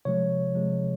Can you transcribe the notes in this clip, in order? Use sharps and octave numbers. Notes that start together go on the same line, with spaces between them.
C3 F3 G#3 C#5
C3 F3 G#3